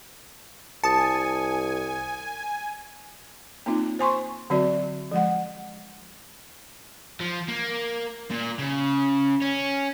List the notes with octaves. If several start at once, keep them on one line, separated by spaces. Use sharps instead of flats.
C2 G#5 A5 D#6 C#7
A#3 C4 D#4 F4
C5 G#5 C6 C#6
D3 F#3 C4 F#4 D5
F3 G#3 F#5
F3
A#3
A#2
C#3
C#4